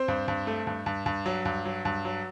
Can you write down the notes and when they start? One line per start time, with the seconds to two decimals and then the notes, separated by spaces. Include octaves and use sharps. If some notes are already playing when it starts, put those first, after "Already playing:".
Already playing: C4 C5
0.08 G2
0.28 G2
0.47 A3
0.67 G2
0.86 G2
1.06 G2
1.26 F#3
1.45 G2
1.65 F#3
1.85 G2
2.05 F#3